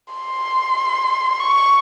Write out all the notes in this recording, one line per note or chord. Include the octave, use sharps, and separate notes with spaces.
C6
C#6